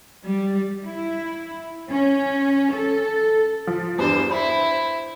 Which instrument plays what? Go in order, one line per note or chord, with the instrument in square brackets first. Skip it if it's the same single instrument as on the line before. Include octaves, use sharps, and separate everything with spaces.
[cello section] G3
E4
C#4
A4
[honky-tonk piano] F3
[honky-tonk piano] E2 G2 [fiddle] C5
[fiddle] E4 [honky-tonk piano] C5 B5